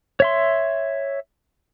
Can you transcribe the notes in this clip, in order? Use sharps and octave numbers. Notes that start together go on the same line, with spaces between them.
C#5 E5 C6